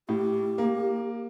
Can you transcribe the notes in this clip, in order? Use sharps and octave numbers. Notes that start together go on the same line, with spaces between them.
A2 G4
A#3